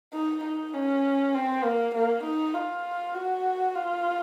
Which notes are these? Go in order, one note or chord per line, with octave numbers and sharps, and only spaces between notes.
D#4
D#4
C#4
C4
A#3
A#3
D#4
F4
F#4
F4